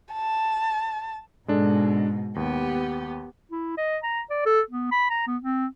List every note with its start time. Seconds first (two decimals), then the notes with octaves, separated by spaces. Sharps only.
0.13 A5
1.48 G#2 B2 G#3 D4 A4
2.36 D#2 B3 G4
3.52 E4
3.78 D#5
4.03 A#5
4.30 D5
4.46 A4
4.70 B3
4.92 B5
5.10 A#5
5.27 B3
5.43 C4